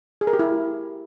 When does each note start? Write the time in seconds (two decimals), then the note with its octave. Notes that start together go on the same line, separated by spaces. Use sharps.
0.21 G#4
0.27 A#4
0.33 G4
0.39 E4